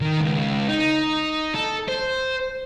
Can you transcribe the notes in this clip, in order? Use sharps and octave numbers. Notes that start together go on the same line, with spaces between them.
D#3
C#2
D#4
A4
C5